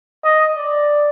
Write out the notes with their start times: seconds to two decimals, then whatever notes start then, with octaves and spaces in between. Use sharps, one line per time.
0.24 D#5
0.56 D5